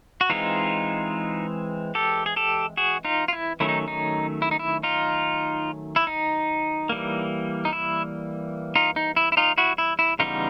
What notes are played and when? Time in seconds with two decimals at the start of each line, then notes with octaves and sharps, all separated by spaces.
0.21 F#4
0.30 E3 G#3 C4 D#4 F4
1.95 G4 A4
2.26 G#4
2.36 G4 A4
2.77 F#4 G#4
3.05 D#4 F4
3.28 F4
3.33 E4
3.60 D#3 F#3 A3 C#4 E4
3.69 D#4
3.88 D#4
4.42 E4
4.51 D#4
4.59 E4
4.83 D#4 F4
5.96 E4
6.07 D#4
6.89 E3 G3 A#3
7.65 D#4
7.73 E4
8.76 D#4 F4
8.96 D#4
9.16 E4
9.32 E4
9.37 D#4 F4
9.58 E4 F#4
9.78 E4
9.99 E4
10.19 C#3 E3 G3 B3 D#4 F4